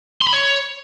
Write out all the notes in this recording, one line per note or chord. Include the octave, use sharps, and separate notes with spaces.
C6
B5
C#5